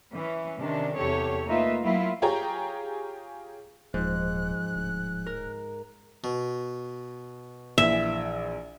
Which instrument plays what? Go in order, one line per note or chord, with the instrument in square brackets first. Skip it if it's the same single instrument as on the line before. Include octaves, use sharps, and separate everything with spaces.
[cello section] E3 C#4
C3 D#3 C#4 D4
E2 C3 G4 A4 C#5
A3 A#3 D#4 F4 B4 E5
F#3 A#3 E4 F4
[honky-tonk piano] F4 G4 G#4 C#5 G5 A#5
[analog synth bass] D#1 [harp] G#2 [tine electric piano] F3 [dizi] F#6
[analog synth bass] D1
[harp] A#4
[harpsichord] B2
[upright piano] A#1 E3 [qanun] E5